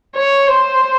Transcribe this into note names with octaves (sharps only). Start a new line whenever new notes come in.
C#5
C5